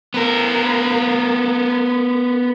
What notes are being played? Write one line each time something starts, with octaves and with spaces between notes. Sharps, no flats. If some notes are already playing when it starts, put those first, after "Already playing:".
B3 A#4